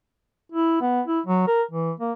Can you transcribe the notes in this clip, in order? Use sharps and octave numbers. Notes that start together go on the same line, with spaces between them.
E4
B3
E4
F#3
A#4
E3
A#3